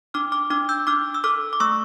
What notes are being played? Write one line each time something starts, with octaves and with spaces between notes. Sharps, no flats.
D4 D6 F6
D6 F6
D4 D6 F6
E6 G6
D4 D6 F6
E6
A4 D6 F6
D6
A3 C#6 E6